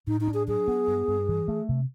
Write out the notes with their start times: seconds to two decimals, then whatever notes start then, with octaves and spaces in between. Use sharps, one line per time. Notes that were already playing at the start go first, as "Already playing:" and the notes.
0.07 A2 D#4
0.21 D#4
0.28 D4
0.34 G#4
0.47 F#3 G#4
0.68 B3
0.87 G2
1.08 G2
1.29 E3
1.48 A3
1.69 C3